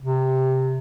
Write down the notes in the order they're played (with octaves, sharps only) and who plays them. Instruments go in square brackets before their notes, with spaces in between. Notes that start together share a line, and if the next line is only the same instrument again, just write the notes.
[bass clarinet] C3